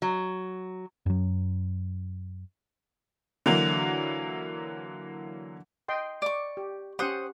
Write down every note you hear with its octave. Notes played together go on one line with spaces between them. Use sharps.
F#3
F#2 F#3
D3 E3 F#3 A#3
D#5 G5 C6
D5 C#6
G4
C#4 G4 C5 F#5 D#6